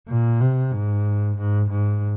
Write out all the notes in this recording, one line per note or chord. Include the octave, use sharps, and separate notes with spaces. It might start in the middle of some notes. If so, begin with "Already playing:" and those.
A#2
C3
G#2
G#2
G#2